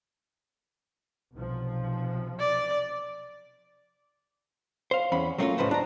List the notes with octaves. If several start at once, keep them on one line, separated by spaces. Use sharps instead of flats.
B1 C3 F3
D5
C5 F5
E2 C#4 B5
F#3 A3 A#3 C4 C#4 F4
C#2 A2 C#3 B4 C5
D4 A#5